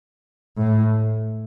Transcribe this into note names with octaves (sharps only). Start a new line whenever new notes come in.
A2